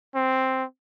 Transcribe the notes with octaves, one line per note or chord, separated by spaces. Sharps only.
C4